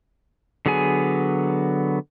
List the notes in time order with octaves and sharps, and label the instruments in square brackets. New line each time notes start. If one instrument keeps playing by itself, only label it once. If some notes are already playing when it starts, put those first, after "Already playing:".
[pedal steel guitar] D3 F#3 B3 G#4 G#5